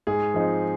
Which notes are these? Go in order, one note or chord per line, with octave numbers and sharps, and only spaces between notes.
G#2 G#4
F3 G#3 C4 D#4